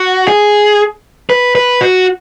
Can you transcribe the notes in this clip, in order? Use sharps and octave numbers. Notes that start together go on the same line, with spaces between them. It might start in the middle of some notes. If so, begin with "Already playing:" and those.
Already playing: F#4
G#4
B4
B4
F#4